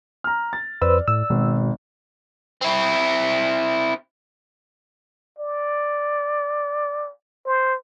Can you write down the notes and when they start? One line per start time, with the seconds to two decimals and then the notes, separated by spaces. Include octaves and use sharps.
0.24 A#5 F6
0.53 A6
0.82 F2 B4 C5 D5 E6
1.08 A2 E6
1.30 G#1 B2
2.61 C4 E4
5.39 D5
7.46 C5